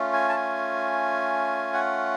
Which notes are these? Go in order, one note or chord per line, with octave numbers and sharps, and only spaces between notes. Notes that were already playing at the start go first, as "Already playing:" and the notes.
Already playing: A3 C#4 F4
G#5
A5
G#5
F#5